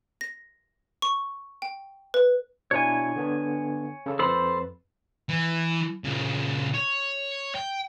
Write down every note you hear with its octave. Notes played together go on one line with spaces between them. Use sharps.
A#6
C#6
G5
B4
B2 D4 E4 C#5 G#5
D3 B3 D4
C#3 A4
F2 A4 B4 C5 B5
E3
A#2 C#3
C#5
G5